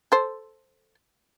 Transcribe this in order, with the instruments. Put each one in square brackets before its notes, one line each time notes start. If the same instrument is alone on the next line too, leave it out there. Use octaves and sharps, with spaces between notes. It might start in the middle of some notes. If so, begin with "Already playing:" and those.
[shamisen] A4 C5